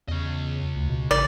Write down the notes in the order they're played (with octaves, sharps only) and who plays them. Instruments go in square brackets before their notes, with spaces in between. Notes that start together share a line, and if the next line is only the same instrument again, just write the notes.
[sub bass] E2 [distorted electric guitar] C#3 D#5
[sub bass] D2
B2
[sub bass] A1 [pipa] D5